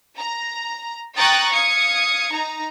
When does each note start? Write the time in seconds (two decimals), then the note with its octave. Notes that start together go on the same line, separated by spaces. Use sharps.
0.18 A#5
1.16 G5 A#5 C#6 D#6 F#6 A6
1.51 F5 D#6 G#6 C#7
2.31 D#4 A#5